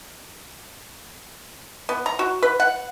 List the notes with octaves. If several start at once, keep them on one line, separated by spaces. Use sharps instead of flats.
B3
A#5
F#4
B4
F#5